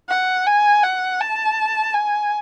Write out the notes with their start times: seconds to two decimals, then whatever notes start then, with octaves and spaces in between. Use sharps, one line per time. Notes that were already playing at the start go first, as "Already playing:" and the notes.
0.09 F#5
0.46 G#5
0.83 F#5
1.21 A5
1.94 G#5